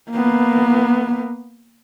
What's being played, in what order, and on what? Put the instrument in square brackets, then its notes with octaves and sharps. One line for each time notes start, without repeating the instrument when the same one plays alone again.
[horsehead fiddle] A#3 B3